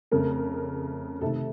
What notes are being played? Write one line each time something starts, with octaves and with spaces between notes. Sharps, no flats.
F2 C#3 A3 A#4
C3 D#3 A3 A4